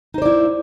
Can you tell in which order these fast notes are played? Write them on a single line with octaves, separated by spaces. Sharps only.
D#4 C5 D5 E4